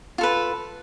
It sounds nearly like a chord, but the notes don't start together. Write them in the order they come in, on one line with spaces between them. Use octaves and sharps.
F4 A4 B4